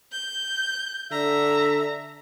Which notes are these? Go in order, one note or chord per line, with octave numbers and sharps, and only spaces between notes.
G6
D3 E5 A#5